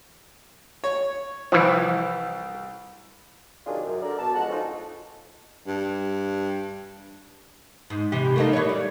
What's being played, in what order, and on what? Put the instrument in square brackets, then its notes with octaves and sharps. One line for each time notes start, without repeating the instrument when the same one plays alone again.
[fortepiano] C#5
[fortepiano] C2 [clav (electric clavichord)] E3 F3
[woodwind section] C3 D#3 F#3 D4 F4 G#4
F#2
D3 A#4 D5
B2 A5
C#2 F3 G#3 F#5
C#4 D#4 F4 F#4 A4
[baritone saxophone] G2
[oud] G#2
C3 E3 G4
A3 A#3 D#4
E3 C#5
G3